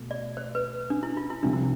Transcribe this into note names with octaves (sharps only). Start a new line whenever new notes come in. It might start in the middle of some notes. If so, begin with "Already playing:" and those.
Already playing: B2 A3
D5
C5
B4
D4
E4
F4
E4
C2 C3 F3 D4
E4